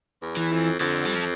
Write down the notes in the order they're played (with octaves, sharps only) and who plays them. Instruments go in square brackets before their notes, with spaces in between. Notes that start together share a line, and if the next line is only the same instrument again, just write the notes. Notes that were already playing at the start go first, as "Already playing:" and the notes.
[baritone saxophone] E2
[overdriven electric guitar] E3
[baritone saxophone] F2
[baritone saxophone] F2 [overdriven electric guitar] D3
[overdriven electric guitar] G3
F3